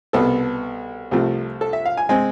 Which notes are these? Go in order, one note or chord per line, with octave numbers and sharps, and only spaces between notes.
C2 B2 B3 A4
C2 C3 F3 A3
A4
E5
F5
G#5
G#3 C4 G#5